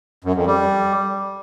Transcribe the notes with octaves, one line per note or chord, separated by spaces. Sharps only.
F#2
F2
G3